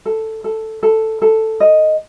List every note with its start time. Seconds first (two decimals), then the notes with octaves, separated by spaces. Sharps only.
0.06 A4
0.44 A4
0.83 A4
1.22 A4
1.60 D#5